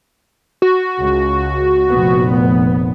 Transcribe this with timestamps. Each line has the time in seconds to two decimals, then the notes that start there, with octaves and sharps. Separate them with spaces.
0.62 F#4
0.99 C#2
1.90 F1 A#2 B3